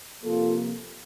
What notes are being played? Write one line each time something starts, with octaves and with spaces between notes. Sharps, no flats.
C3 F3 A#3 F4 A4